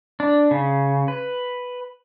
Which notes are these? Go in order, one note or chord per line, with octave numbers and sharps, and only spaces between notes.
D4
C#3
B4